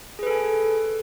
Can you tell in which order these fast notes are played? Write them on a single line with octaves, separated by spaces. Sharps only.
G#4 B4 A4 G#5